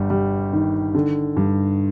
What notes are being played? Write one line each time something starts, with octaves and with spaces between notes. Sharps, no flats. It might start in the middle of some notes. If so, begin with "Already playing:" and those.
Already playing: G1 G3
G3
D#3
D3
G2